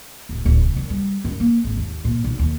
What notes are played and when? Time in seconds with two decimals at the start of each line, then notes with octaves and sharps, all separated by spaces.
0.29 D1
0.45 D1
0.61 C3
0.76 F#2
0.90 G3
1.25 F#2
1.40 A#3
1.64 G#1
1.77 D#2
2.05 A#2
2.24 B1
2.39 D#2